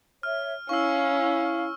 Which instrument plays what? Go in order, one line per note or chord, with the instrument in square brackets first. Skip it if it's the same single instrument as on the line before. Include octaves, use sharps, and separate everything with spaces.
[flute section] C#5 E5 [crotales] F6
[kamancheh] C#4 [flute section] E4 [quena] F5 [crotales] C#6 E6